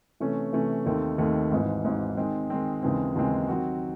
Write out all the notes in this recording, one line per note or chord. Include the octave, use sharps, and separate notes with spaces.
C3 E3 A3 C#4
C3 E3 A3 C#4
D#2 D#3 A3 C4
D#2 D#3 A3 C4
G#1 G#2 E3
G#1 G#2 E3
D#3 G#3 C4
D#3 G#3 C4
D#2 C#3 E3 G#3 C4
D#2 C#3 E3 G#3 C4
D#3 F#3 C4 F#4